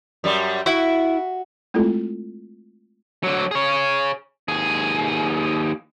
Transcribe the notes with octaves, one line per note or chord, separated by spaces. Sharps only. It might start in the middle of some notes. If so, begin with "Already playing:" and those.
F#2 G3
E4 F#4
G#3 A3 C4 E4 F4 A4
D3 F#3
G#4 C#5
D#2 G#4